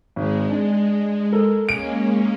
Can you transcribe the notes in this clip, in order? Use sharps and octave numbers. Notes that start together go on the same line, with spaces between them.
G#1 G#3
G#3 D4
A4 A#4
G#3 A#3 C#4 D7